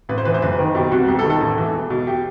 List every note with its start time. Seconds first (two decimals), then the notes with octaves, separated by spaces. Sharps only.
0.09 A1 B4
0.18 C5
0.25 E3 B4
0.34 C5
0.42 F#1 B4
0.59 D#3
0.75 B2 G4
0.92 C2 F#4
1.08 E1 G4
1.19 A4
1.25 D#3
1.30 A4
1.40 A1 A4
1.58 E3
1.73 E1
1.90 B2
2.07 G4